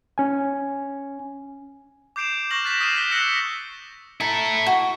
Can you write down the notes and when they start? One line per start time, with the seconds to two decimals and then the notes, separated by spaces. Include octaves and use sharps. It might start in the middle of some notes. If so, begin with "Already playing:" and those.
0.18 C#4 G#5
2.16 D6 G6 C7 D7 E7 F7
2.51 C#6 F6 A#6 E7 F#7
2.64 F#6 A6 B6 E7 F#7
2.81 D#6 F6 A6 C7 D#7 E7
2.94 D6 G6 A#6 B6 G7
3.11 E6 F#6 A#6 C#7 E7 F#7
4.21 E4 A4 A#5
4.66 F#4